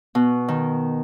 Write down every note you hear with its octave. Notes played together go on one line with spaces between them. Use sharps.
B2
D#3